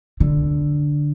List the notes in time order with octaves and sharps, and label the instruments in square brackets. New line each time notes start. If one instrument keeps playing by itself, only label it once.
[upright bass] D3